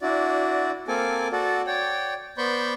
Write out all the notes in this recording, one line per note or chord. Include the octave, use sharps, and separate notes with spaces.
D4 E4 F#4 D5
A#3 C4 A4 G#5 D6
F#4 A4 D5
C#5 D5 G5
B3 C5 D5 B5 C#6 G6